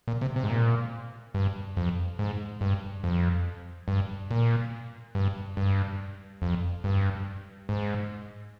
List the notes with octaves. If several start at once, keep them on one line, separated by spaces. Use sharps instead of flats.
A#2
C3
C3
G#2
A#2
G2
F2
G#2
G2
F2
G2
A#2
G2
G2
F2
G2
G#2